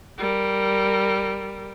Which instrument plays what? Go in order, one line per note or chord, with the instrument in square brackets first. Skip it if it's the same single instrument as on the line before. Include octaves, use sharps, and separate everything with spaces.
[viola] G3 A#4